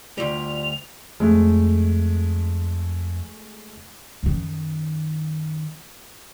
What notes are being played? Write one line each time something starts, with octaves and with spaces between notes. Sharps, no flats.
D2 G3 F4 F7
F2 G#3 A3
F#2 D#3